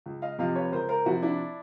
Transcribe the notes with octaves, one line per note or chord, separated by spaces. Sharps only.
C#2
D#5 F5
C3 F3 D#5 F5
B4 C#5
C#2 A#4 C5
A#4 C5
C3 F3 E4 F#4
D4 E4